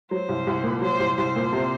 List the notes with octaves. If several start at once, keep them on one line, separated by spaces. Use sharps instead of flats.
F#3 C5
C2
C2
A#2
F#3 C5
C2
C2 C5
A#2
C3